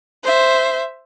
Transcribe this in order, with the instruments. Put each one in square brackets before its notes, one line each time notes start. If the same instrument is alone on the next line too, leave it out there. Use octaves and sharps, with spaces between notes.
[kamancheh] C5 E5